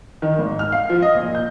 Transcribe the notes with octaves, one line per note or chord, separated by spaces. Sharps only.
D#3
G#1
F6
F5
F3
D#5
A#2
G6